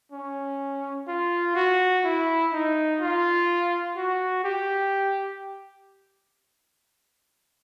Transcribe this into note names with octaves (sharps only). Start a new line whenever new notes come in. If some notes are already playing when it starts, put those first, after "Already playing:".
C#4
F4
F#4
E4
D#4
F4
F#4
G4